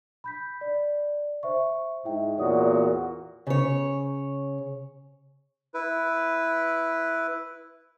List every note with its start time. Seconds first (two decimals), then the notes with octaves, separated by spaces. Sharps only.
0.24 B5 G6 B6
0.61 D5
1.43 C5 E5 C#6
2.05 G#2 E4 E5 G5
2.38 E2 A#2 F#4 C#5 D5 D#6
3.47 C#3 C#5
5.74 E4 B4